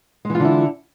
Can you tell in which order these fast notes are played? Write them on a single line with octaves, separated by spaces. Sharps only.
G#3 E3 F4 D3 E4